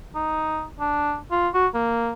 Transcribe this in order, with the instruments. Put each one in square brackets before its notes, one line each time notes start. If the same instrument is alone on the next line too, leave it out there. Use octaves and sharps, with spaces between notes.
[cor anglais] D#4
D4
F4
F#4
A#3